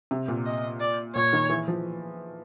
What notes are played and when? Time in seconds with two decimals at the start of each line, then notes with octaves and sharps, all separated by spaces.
0.11 C3
0.28 A#2
0.46 D#5
0.80 D5
1.15 A#2 C#5
1.33 D#3
1.50 E3
1.68 F3